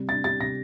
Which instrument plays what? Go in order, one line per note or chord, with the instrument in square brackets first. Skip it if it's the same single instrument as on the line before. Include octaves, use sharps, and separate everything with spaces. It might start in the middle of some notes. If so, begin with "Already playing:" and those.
Already playing: [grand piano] C3 G3
[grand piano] D4 [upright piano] A6
[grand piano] G4 [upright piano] A6
[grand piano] C3 [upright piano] A#6